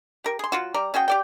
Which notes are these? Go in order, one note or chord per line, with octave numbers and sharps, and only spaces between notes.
G4 A#4
G#4 C6
F#3 F4 F#4
G3 D5 A#5
C#4 F#4 G#4 G5
G4 D5 G5